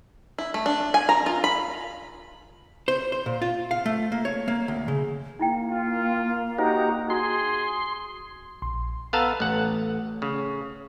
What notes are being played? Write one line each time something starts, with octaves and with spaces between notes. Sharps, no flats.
E4
A3
D4
G#5
A#5
F4
B5
C5
C5
A#2
F4
F5
A3
A#3
C#5
A#3
D2
C#3
A#3 D#4 E4 G5
F4
D#4 F#4 G4 C5 A#5
F#4 G#4 C6
A#1 C6
B3 A4 F5 A5 A#5 E6
A1 A3 F#5
C#3